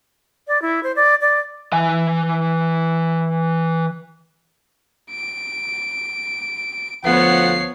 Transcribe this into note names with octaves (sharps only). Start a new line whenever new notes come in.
D5
E4
C5
D5
D5
E3 G#5
D7
D2 F3 B3 C#5 F#5 C7